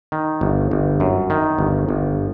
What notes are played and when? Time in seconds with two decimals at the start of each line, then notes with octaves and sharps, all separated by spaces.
0.12 D#3
0.41 G1
0.71 G1
1.00 F#2
1.30 D#3
1.59 G1
1.89 G1